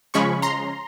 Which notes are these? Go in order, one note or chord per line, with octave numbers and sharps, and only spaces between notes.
C#3 F3 G#3 C#4 B5 C#6
A#5 C6